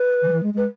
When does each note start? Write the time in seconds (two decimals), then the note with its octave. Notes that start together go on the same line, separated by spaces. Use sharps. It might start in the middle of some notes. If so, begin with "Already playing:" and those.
Already playing: B4
0.22 D#3
0.28 F#3
0.32 E3
0.43 G#3
0.54 G#3 B4